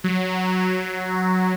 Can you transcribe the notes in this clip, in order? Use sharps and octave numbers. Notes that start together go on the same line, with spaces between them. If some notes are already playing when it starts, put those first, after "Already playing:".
F#3